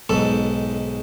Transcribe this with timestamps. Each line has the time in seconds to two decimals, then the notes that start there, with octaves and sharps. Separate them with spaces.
0.09 B1 G#2 A4